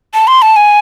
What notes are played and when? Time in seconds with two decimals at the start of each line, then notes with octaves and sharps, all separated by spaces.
0.14 A5
0.27 C6
0.42 A5
0.56 G#5